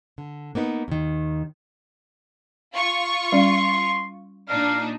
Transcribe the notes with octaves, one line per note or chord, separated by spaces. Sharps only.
D3
A#3 B3 D#4 B4
D#2 D#3
F4 C#6
G3 C#4 D5 C6
A#2 D4 D#4 F5